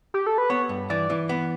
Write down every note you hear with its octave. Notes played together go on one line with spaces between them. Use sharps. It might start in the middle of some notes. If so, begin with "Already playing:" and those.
G4
A4
B4
B3 C#5
G2
E3 D5
E3
B3